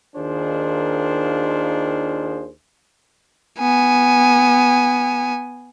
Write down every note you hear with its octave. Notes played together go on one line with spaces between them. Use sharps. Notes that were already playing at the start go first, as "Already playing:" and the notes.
D#2 D#3 D4 F4 G#4 C5
B3 G#5